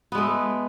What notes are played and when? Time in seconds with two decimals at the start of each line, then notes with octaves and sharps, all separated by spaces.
0.12 B3
0.15 G#3
0.18 A3